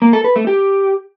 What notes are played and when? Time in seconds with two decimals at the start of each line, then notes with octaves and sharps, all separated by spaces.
0.02 A#3
0.13 A4
0.24 B4
0.36 A3
0.47 G4